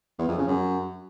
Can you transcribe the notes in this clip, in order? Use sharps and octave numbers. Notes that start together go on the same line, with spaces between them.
E2
F2
C#3
F#2